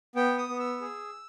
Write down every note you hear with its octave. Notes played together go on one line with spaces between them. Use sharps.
B3 G5
D#6
B3
E6
G#4